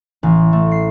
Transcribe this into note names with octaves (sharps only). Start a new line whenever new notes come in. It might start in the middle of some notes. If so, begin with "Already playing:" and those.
A1
A3
C7